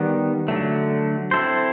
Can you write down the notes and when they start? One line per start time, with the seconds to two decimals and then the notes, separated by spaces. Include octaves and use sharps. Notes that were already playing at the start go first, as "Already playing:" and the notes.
Already playing: D#3 G3 B3
0.48 D3 F#3 A3
1.31 C4 E4 A4 C5